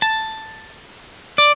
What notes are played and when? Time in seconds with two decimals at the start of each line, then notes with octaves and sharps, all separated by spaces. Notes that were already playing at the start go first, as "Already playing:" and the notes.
0.02 A5
1.38 D5